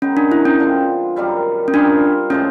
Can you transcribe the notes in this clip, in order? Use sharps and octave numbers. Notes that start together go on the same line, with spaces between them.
D#3 G#3 B3 C#4
D4
E4
C#4
D3 F3 G#3 C4
F#2 D#3 G3 C4
C#4
G3 C4 D4 F4 A#4
A2 F3 G#3 C#4